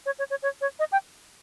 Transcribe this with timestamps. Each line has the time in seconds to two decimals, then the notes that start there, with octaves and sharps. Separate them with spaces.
0.06 C#5
0.19 C#5
0.30 C#5
0.43 C#5
0.61 C#5
0.79 D#5
0.92 G5